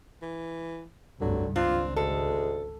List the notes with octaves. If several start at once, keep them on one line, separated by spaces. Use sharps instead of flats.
E3
F1 C2 G2 D3 F#3
G#1 C#2 C4 D4 F4
D2 G#3 A4